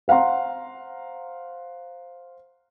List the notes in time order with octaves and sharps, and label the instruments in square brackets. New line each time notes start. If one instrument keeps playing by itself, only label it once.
[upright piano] C5 F5 F#5 A#5 C6